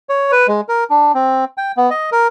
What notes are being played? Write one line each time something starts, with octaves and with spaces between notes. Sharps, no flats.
C#5
B4
G#3
A#4
D4
C4
G5
B3
D#5
A#4